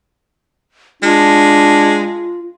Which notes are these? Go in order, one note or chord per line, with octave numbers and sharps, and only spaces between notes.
G#3 D4 F4